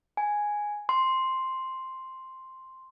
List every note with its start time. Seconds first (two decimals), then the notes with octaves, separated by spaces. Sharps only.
0.17 G#5
0.89 C6